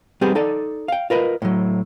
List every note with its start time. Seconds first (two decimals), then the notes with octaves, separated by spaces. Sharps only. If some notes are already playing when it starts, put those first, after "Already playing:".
0.21 G3 B3 C4 D#4 G4 G#4
0.35 D#4 A4 D5
0.88 F5 G5
1.10 F4 A#4 B4 D#5
1.42 A2 F#3